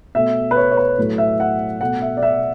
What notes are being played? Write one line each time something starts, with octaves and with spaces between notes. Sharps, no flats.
B2 A3 E5
B4
C#5
C#5
B4
A2 F#3 A3
E5
F#5
B2 A3 F#5
E5
D5
E5